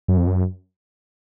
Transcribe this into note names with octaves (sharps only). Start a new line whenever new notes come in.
F#2
F2
F#2